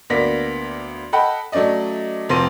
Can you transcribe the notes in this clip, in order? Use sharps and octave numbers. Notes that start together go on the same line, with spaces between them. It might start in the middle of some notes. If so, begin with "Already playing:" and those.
D2 A#3 B3 D5 A#6 B6
A4 D#5 F#5 G5 B5
F#3 A3 C#4 D5 D#5
F1 F3 C4 C6 A#6 D#7